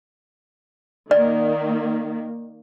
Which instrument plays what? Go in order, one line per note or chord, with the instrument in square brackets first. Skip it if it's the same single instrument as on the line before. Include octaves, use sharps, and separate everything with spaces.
[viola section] D#3 A#3 [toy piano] D5